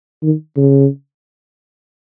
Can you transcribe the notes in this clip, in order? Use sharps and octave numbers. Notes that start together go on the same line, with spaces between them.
D#3
C#3